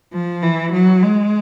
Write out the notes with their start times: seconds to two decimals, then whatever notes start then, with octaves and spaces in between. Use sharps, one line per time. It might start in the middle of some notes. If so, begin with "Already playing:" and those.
0.13 F3
0.43 E3
0.73 F#3
1.03 G#3